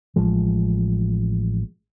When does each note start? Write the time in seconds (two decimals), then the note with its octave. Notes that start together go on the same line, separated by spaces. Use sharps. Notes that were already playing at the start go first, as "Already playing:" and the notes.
0.16 A1 F3 G#3